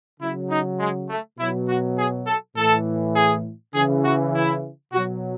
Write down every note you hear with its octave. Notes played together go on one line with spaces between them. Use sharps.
C#3 F#3 E4
D#4
G#3
A3
B2 F#3 E4
F#4
G#4
A4
A2 E3 A4
G#4
C#3 E3 G#4
F#4
E4
B2 F#3 F#4